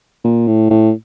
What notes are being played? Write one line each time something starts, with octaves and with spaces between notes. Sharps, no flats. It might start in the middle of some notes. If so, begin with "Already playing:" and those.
A#2
A2
A2